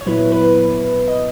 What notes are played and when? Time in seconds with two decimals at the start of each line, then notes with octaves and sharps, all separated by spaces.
0.01 C#5
0.06 A#2 F#3 B3 E4 B4
0.32 B4
1.08 D#5